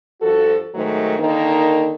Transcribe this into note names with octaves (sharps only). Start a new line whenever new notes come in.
G2 F3 F#4 A4
G#2 D#3 F#3 A3
D3 D#3 A#3 D#4